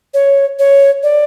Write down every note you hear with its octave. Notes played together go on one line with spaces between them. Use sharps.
C#5
C#5
D5